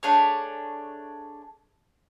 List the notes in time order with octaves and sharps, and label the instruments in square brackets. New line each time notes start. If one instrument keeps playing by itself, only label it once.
[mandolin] A3 D4 G#4 C#5